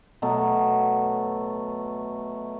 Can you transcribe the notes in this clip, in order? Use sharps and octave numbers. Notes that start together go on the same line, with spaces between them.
B2 F#3 A3 B3